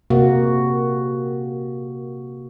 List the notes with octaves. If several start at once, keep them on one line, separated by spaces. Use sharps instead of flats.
C3 A#3 F#4